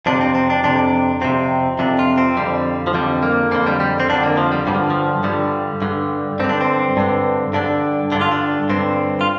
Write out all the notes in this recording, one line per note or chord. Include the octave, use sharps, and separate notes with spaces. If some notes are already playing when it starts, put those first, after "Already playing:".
F2 C3 D4
C4
C4
D4
F2 C3 D4
F2 C3 C4
F2 C3 D4
F4
C4
F2 D3 G3
F3
F2 D3 G3
A#3
F2 D3 A#3
G3
G3
C4
F2 D3 D4
A#3
F3
G3
G2 D3 G3
F3
F3
G2 D3 G3
G2 D3
G2 D3 C4
D4
C4
G2 D3
G2 D3 D4
G2 D3 D4
F4
D4
G2 D3 C4
F4